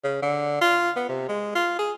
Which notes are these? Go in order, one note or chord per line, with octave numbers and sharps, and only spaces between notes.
C#3
D3
F4
B3
C3
G#3
F4
G#4